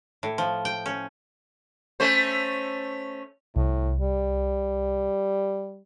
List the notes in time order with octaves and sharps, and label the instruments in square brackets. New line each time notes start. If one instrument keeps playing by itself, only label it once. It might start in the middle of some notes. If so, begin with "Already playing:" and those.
[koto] A2
F3
G5
C#4
[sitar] A3 C#4 C5
[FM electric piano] C2 [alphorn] A2
[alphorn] G3